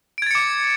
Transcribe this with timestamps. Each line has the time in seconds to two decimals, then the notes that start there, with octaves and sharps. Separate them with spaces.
0.18 D7
0.22 G#6
0.26 A6
0.31 C#7
0.35 D6